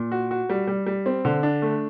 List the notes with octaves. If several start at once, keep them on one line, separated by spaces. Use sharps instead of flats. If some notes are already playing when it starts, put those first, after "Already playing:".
Already playing: A#2
F#4
F#4
G3
G3
G3
C4
D3
D4
A3